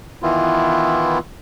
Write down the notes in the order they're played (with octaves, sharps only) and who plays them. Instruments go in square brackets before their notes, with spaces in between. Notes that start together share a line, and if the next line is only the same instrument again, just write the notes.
[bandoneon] D#3 E3 B3 E4 F4